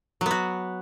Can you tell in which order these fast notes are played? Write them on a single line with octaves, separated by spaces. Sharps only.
F#3 B3 F#4